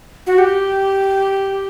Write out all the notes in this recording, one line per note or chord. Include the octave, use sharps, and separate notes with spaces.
F#4
G4